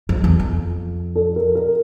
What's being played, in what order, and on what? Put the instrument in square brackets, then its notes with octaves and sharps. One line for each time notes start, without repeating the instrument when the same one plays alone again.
[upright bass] F2
E2
F2
[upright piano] A4
A#4
A#4